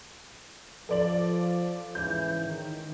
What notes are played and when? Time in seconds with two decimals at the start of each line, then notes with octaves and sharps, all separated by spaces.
0.89 F3 A4 D5 F#7
1.95 G#2 C#3 E3 G6
2.44 D#3